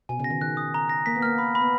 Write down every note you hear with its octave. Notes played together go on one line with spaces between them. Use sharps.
B2 G#5
C#3
A#6
D#3
D#3 F#6
D#6
A#5
A#6
A#3 B6
B3
A#3 F6
B5
B5
B3